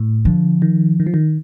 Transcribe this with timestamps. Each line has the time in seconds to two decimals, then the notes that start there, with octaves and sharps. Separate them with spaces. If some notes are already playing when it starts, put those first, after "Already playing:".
Already playing: A2
0.25 D3 F3
0.62 D#3
1.00 D#3
1.07 F3
1.14 D#3